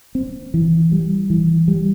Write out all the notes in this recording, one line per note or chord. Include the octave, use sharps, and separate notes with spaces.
C4
E3
G3
E3
G3